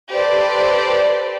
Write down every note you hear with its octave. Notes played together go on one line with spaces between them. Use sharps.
G4 A4 B4 C5 D5